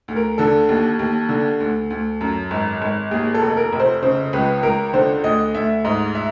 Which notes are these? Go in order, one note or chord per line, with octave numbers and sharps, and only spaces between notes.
D2
A#4
D3 A4
D#2
D#2
D3
D2
D2
F#2
G#1
G#1
D#2 G#4
A4
F1
A#4
F1
C5
C#3 C5
C#2 B4
C#2 A#4
D3 C5
D2 D#5
D2 E5
G#2 D#5
E5